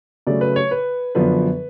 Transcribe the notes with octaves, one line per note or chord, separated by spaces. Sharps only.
C#3 F#3 A3 D5
B4
C#5
B4
F#2 D3 F3 B3 B4